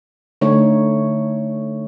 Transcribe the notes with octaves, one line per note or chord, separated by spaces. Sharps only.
D3 A3 D#4 C#5